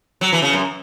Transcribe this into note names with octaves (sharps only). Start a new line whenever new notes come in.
F#3
E3
C#3
F#2